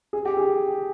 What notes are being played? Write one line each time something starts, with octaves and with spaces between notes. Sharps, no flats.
G#4
G4
G#4